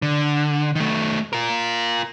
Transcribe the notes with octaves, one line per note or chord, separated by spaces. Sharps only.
D3
D#3 A3
F4 A#4